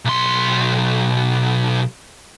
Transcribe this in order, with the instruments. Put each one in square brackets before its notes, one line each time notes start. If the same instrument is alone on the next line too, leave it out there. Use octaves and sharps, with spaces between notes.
[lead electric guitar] B1 C6